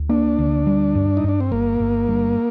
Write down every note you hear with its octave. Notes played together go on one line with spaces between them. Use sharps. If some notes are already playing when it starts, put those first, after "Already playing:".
Already playing: D2
A#3 D4
D2
G3
G2
D#4
G2 D4
C4
G1 A#3
G1
G2